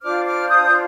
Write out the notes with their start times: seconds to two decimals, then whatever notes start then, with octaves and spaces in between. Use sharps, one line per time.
0.02 D4 F4 C5 D6 F6
0.25 D6 F6
0.49 D#6 G6
0.65 G6